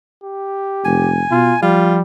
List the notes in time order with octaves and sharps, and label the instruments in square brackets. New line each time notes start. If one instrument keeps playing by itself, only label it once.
[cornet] G4
[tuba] F1 [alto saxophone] G#5
[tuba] B2 [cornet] F4
[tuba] F3 [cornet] G3 [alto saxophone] F4